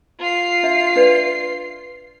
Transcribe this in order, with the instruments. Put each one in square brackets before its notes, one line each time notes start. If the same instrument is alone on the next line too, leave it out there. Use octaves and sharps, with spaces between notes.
[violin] F4 C7
[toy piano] D4 E5
D4 B4 D5